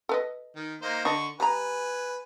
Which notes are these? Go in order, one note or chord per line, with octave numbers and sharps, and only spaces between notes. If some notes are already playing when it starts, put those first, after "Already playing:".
A4 B4 D#5
D#3
A#3 D#4 C5
D3 D4 D#5 C#6
G3 B4 G#5 A#5